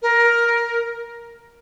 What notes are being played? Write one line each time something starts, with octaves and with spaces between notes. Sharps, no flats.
A#4